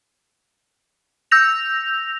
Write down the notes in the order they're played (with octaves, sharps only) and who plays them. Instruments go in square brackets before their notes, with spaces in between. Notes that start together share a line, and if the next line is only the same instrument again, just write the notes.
[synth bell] E6 G6 A#6 F7